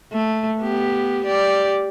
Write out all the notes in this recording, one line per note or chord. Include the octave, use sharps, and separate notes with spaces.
A3
B3 G4
G4 D5